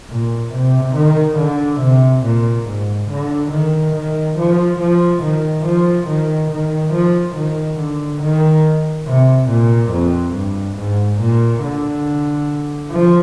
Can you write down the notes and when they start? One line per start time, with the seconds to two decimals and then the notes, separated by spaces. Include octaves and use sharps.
0.10 A#2
0.53 C3
0.95 D#3
1.38 D3
1.80 C3
2.24 A#2
2.67 G#2
3.09 D3
3.51 D#3
3.94 D#3
4.38 F3
4.79 F3
5.22 D#3
5.65 F3
6.08 D#3
6.50 D#3
6.93 F3
7.35 D#3
7.79 D3
8.22 D#3
9.06 C3
9.49 A#2
9.92 F2
10.34 G2
10.77 G#2
11.20 A#2
11.62 D3
12.91 F3